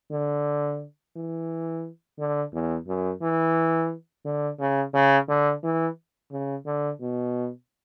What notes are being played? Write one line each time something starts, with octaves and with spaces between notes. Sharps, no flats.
D3
E3
D3
E2
F#2
E3
D3
C#3
C#3
D3
E3
C#3
D3
B2